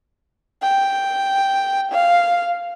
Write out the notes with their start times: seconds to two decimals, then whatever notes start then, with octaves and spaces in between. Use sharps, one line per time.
0.63 G5
1.92 F5